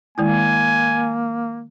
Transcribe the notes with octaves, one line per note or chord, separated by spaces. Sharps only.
D#3 G#3 A#3 E4 G#5